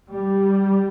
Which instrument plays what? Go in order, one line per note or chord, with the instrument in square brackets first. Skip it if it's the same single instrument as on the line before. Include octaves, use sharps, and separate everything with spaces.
[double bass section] G3